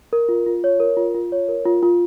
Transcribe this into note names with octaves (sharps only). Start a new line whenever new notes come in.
A#4
F4
F4
C#5
A#4
F4
F4
C#5
A#4
F4
F4